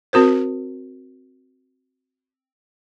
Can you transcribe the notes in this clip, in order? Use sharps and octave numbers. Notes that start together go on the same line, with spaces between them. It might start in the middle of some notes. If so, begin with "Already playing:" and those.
C4 F#4 A#4 C5